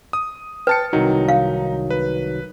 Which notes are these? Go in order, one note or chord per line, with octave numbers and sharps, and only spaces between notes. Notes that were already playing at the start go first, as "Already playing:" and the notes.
D#6
B4 G5 A5 C#7
C2 D#3 F#3 D#4
F5
B4